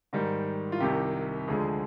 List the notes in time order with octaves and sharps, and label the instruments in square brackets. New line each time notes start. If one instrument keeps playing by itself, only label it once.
[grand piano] G#2 D#3 G3
F4
C2 C3 D#3 G4
D2 D3 F3 G#3 G#4